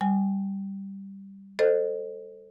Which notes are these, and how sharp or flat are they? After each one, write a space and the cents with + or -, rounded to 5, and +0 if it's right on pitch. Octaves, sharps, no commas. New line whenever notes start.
G3 +0 G#5 +10
A4 +15 C5 +0 D#5 -30